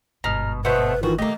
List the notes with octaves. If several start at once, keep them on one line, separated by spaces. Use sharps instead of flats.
G1 G#2 B2 A#5 F6
B2 A3 B4 C5 E5 F#5
D#3 E3 F4 F#4
A#2 D#3 A3 A#3 G4 D#5